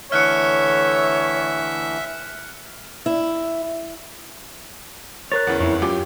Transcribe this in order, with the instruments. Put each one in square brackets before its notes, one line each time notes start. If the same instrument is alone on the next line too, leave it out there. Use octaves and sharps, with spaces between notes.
[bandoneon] D3 E3 A3 [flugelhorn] C#5 [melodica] E5 [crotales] F6 F#6 C#7
[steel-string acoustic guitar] E4
[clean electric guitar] A#4 C#5 [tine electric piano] F#6 A6
[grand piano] E2 C#3 E3
[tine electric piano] F2 [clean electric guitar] E4 A#4 C#5
[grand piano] F#2 D6 [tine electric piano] F4 [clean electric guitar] G4